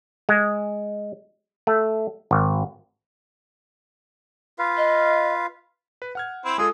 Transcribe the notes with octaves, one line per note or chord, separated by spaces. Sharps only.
G#3
A3
G#1
F4 B4 F5
D#5
B4
F#5 F6 G#6
C4 E4
G#3 F4 G#4 A4